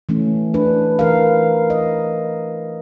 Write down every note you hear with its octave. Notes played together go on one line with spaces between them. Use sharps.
E3 A3 C#4
D4 B4
E3 A#4 F5
D#5